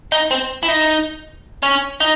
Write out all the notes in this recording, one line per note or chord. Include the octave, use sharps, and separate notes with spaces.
D#4
C4
E4
D#4
C#4
D#4